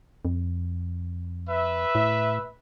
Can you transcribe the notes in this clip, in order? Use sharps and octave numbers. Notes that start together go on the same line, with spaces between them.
F2
B4 E5
A2